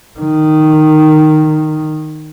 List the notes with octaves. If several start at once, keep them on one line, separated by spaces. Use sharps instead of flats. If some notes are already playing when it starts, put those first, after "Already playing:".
D#3